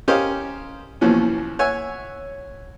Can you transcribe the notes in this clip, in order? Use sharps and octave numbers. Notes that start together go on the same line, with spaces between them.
C#4 G4 A#4 C5 D#5 F5
D#2 B2 E3 F3 C#4
C#5 E5 F#5 G#5